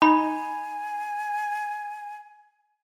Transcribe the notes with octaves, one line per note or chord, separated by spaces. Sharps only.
D#4 G#5 B5